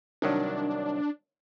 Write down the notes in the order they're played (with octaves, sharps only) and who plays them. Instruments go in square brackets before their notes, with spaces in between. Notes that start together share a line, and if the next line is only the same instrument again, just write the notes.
[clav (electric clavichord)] C2 D#3 F#3 [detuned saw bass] D4